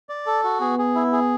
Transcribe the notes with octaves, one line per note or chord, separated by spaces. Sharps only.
D5
A4
F#4
B3 G#4
G#4
E4
G#4